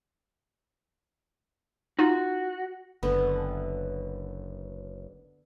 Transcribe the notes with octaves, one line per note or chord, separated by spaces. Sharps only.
D#4 F4 F#4
F#1 D3 B3